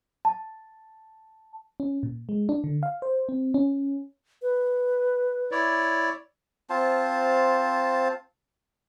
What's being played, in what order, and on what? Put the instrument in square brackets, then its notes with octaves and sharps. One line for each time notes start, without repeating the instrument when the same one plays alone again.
[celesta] A5
[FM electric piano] C#4
A#2
G#3
D4
D3
F5
C5
C4
C#4
[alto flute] B4
[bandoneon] E4 C#5 D5
[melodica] C4 F4 C5 A5